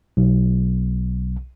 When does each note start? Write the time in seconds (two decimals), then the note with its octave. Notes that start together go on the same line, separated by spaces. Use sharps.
0.17 B1